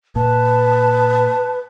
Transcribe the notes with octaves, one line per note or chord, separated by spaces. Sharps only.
A#2 B4 A5